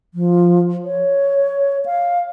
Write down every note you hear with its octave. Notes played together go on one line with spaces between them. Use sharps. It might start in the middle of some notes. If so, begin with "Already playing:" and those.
F3
C#5
F5